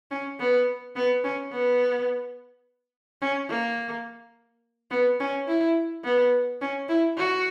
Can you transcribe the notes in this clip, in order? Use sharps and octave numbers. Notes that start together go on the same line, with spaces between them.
C#4
B3
B3
C#4
B3
C#4
A#3
B3
C#4
E4
B3
C#4
E4
F#4